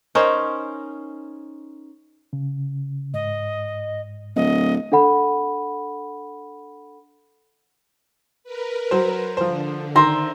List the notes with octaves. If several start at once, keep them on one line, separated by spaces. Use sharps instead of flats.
C#4 D#4 A#4 C5
C#3
G#2 D#5
D1 D#5
D4 A4 F#5 B5
A#4 B4
F#3 C5
D3 F3 C5
D#3 C5 E5 A#5